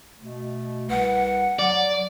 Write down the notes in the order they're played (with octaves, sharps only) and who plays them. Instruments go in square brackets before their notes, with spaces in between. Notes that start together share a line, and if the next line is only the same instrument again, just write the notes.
[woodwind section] B2 A3
[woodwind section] C2 B4 [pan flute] F#5
[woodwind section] F#3 [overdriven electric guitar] D5